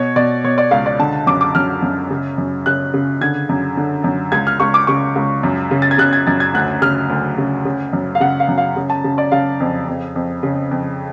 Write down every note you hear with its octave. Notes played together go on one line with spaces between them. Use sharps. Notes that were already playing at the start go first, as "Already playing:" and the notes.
Already playing: B2 C#5
B2 D5
B2 C#5
D5
C#2 F5
D5
D3 A5
F#2 D6
D6
F#2 F6
F#2
C#3
F#2
C#3 F#6
C#3
D3 G#6
F#2
D3
F#2
C#2 G#6
F6
C#2 C#6
D6
C#3 C#6
C#2
F#2
C#3
A6
G#6
C#3 F#6
G#6
F#2 A6
G#6
D2 F#6
C#3 F6
D2
C#3
C#3
F#2
F5
C#3 F#5
F5
F#2
F5
C#3
A5
C#3
D5
C#3 F5
F2
F2
F2
C#3
F2